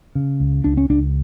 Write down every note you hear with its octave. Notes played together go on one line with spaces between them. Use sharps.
C#3
C#2
C#2 D4
C#4
C#2 D4